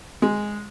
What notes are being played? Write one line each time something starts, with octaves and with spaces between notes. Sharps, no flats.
G#3